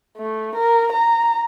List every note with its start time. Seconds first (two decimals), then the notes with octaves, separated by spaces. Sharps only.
0.17 A3
0.56 A#4
0.93 A#5